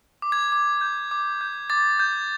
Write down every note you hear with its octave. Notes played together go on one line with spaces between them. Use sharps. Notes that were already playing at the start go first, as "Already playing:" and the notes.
D6
G#6
D6
G6
D6
G6
D6 A6
G6